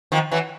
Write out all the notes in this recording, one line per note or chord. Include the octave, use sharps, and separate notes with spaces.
D#3 F3
E3 F#3